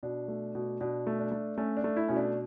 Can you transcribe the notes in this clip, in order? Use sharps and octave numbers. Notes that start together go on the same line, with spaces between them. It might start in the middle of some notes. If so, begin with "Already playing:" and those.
B2 D4
A3
B2
B2 D4
A3
D4
A3
A3 C#4
D4
A3
E4
B2 C#4
D4